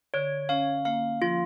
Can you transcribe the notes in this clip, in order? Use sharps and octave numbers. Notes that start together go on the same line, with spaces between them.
D3 C#5
C#4 F5
A#3 F5
F3 F4